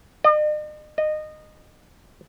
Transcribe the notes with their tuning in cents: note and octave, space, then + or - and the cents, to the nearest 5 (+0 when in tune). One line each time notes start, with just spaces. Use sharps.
D#5 -45
D#5 -20